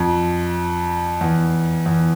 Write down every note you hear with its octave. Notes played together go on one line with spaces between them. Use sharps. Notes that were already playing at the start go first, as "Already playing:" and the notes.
Already playing: F2
E2
E2